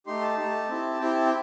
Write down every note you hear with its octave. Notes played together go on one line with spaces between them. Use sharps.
A3 D#4 G4 C6
A5
A3 D#4 G4
C4 E4 G4
C4 E4 G4 G5
A5
G5